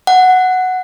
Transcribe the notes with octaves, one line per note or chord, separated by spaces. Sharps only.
F#5